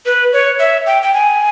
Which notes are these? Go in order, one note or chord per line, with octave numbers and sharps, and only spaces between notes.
B4
C#5
E5
G5
G5
G#5